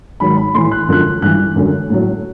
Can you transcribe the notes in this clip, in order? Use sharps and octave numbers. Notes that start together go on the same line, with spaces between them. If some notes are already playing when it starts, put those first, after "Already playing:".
G#2 D#3 F#3 B5
B5
A2 E3 C6
F#6
F#2 D3 F3 F#6
G2 E3 F#6
F#2 D3 F#3
A2 F#3